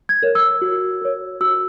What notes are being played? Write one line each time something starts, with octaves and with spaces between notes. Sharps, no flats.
G#6
A#4 C#5
E6
F#4
A#4 C#5
F#4 E6